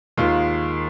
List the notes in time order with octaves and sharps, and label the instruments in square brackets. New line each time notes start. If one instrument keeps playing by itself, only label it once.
[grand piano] D#2 D#3 G#3 F4